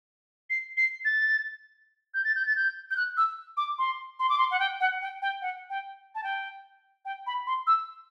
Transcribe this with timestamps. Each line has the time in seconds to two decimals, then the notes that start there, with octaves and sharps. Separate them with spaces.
0.50 C7
0.77 C7
1.05 A6
2.14 G6
2.25 A6
2.35 G6
2.46 A6
2.56 G6
2.91 G6
2.97 F#6
3.17 E6
3.57 D6
3.79 C6
4.19 C6
4.29 D6
4.38 C6
4.51 F#5
4.59 G5
4.80 F#5
5.02 G5
5.22 G5
5.42 F#5
5.70 G5
6.15 A5
6.24 G5
7.05 G5
7.27 B5
7.47 C6
7.67 E6